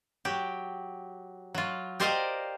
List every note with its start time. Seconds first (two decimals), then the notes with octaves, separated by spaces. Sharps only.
0.25 F#3 G4
1.54 F#3 F4
2.00 G4 A#4 C5 D5 D#5 F5